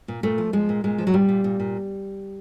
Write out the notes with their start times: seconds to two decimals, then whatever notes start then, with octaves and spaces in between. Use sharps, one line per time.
0.08 A#2
0.23 A#2 A3
0.38 F3
0.53 F3 G#3
0.69 A#2
0.84 A#2 G#3
0.98 F3
1.07 F#3
1.14 A#2 G3
1.29 A#2
1.44 A#2
1.60 A#2